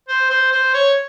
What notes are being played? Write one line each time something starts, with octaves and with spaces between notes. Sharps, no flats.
C5
C5
C5
C#5